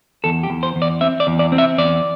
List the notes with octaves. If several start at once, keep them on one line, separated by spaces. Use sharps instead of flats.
E2 A4
G4
E2
C5
E2
D5
C4 E5
D5
E2
D5
C4
E5
E2 D5